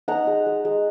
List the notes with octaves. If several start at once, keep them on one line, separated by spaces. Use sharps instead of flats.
D#4 F#5 A#5
G#3
G#3
G#3